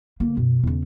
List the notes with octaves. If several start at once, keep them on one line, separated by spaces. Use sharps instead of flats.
D3 A#3
F#2 B2
E2 C#3